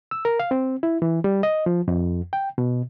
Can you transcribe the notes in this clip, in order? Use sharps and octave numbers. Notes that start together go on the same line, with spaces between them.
E6
A#4
F5
C4
E4
E3
G3
D#5
F3
F2
G5
B2